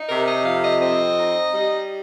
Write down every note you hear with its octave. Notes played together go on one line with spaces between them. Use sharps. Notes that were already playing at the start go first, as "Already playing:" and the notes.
Already playing: D#4
C3 A#4
D#5
F2 F5
D#5
C4 D#5
D#4
G3